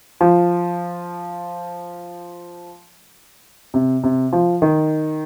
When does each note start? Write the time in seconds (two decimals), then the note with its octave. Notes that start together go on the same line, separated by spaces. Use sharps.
0.21 F3
3.74 C3
4.04 C3
4.33 F3
4.62 D#3